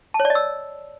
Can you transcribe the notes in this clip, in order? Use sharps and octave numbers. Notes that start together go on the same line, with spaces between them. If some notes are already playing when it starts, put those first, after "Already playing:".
A5
C#5
D5
D#5
E6